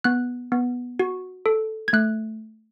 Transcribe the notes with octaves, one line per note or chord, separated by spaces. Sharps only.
B3 F#6
B3
F#4
A4
G#6
A3 F#6